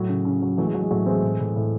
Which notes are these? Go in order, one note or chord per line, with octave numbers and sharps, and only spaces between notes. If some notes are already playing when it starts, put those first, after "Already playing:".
Already playing: A2 F#3
C#3
C#3
F#3
E3 F#3 A3
G#3
E3 F#3
G#3
A2 F#3 A3
E3 G#3 C4
A2
A2
A2